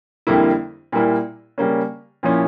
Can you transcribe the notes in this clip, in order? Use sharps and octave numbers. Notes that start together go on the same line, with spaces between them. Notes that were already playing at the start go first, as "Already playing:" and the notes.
F2 D3 G3 A#3 E4
A#2 G3 A#3 E4
C#3 G3 A#3 C#4
A#2 F3 C#4 E4